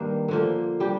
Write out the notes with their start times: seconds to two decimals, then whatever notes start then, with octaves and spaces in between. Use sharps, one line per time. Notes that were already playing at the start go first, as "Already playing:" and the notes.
Already playing: G2 D#3 A#3 D4
0.28 D3 F3 A#3
0.80 G3 D4 G4